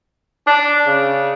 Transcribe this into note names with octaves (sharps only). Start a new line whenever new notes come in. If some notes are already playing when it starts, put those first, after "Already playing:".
D4
C#3